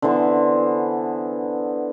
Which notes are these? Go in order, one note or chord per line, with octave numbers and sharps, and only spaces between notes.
D3 E3 B3 C5